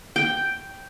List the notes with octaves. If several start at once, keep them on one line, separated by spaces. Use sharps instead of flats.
G5